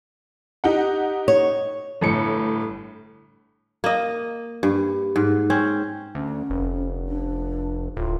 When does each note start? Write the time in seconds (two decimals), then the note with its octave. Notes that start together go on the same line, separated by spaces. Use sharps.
0.64 D#4 G4 F#5
1.28 C#5
2.01 G1 A2 C#7
3.84 A#3 D#5
4.63 G2
5.16 G#2
5.50 C4 C#4
6.15 D2 C#4
6.50 F1
7.08 D4
7.97 D1 F4